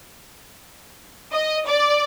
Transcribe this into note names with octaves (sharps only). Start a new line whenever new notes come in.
D#5
D5